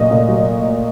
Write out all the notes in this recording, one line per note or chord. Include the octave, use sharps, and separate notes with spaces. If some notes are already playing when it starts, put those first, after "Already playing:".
Already playing: A#2 F#3 A3 D#5
A#2
F#3